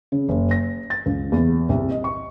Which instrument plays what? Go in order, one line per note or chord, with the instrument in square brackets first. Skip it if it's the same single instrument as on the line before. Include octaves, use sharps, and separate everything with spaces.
[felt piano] C#3
F#1
A#6
A6
C#2
E2
C2
D#5
C#6